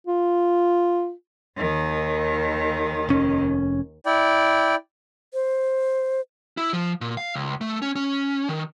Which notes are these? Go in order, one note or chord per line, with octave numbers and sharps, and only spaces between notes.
F4
D#2 D#3
F1 C#4
E4 D5 G5
C5
E4
F3
A#2
F5
C#2
A3
C#4
C#4
D#3